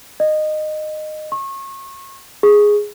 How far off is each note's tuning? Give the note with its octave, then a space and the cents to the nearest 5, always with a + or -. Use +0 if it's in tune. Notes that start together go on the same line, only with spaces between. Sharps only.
D#5 -20
C#6 -30
G#4 +0